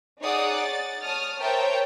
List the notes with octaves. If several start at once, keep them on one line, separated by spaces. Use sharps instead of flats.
D#4 G#4 C#5 D5 F#5 D#6
A6
C#5 A5 D#6 F6
A#4 C5 C#5 E5 G5 A5